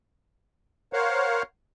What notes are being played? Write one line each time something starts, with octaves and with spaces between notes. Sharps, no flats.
A#4 C5 C#5 F5 F#5